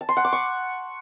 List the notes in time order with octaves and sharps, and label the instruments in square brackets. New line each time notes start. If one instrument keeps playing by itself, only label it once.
[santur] A5
C6
F#5
D6
C#6